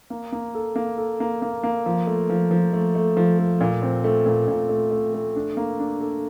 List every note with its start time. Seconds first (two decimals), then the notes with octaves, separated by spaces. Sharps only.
0.10 A#3
0.32 A#3
0.55 A4
0.76 A#3
0.98 A4
1.20 A#3
1.42 A#3
1.63 A#3
1.86 F3
2.07 A3
2.29 F3
2.51 F3
2.73 A3
2.95 A3
3.17 F3
3.39 A3
3.61 A#2
3.82 C4
4.04 A3
4.26 A#2
4.48 A#2
4.69 A3
4.91 A3
5.14 A3
5.36 D4
5.57 A#3
5.79 D4
6.01 A4